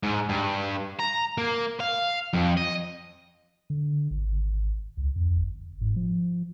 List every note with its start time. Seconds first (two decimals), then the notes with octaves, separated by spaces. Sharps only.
0.03 G#2
0.29 G2
1.00 A#5
1.38 A#3
1.80 F5
2.33 F2
2.57 D#5
3.70 D3
4.11 G#1
4.97 C#2
5.16 F2
5.36 G1
5.81 G#2
5.96 F3